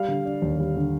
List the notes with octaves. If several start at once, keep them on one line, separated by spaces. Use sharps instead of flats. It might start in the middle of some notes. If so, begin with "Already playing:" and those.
Already playing: G3 F5
D3
D4
D#2
G3
D3